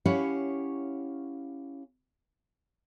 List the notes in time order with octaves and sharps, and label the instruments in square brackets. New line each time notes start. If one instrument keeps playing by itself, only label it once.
[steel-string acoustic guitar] C#4 E4 G4 C#5 F5 F#5